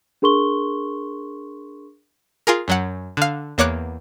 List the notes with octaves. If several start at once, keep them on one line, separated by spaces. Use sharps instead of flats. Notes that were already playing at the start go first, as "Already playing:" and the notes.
D4 G#4 A#4 C6 C#6 G7
F4 G#4 A#4
F#2 F#3 F#5
D3 F5
E2 A#3 C#5 D6 F#6